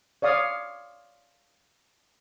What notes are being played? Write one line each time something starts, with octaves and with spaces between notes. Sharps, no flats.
C#5 D5 F5 D#6